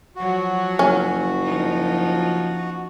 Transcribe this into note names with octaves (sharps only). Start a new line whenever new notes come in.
F3 F#3 F#4
F#1 C#4
F3 D#4